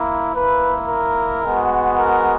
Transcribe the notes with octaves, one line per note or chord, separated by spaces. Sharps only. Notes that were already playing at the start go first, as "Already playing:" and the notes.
Already playing: A#3 E4
A#3 E4 B4
A#4
G#3 B3 F#4
A#4